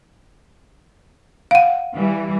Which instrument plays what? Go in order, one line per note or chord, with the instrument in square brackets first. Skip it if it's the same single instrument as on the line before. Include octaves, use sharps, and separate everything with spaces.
[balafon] F5 F#5
[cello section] E3 G3